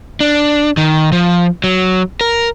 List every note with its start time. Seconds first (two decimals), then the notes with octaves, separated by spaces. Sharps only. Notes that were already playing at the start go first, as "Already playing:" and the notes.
0.20 D4
0.77 D#3
1.12 F3
1.64 F#3
2.21 A#4